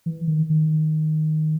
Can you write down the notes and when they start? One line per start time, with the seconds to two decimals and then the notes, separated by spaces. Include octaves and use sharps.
0.06 E3
0.27 D#3
0.50 D#3